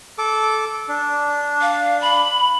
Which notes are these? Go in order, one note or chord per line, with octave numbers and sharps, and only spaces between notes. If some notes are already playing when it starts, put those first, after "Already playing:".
A4 D6
D4
F5
B5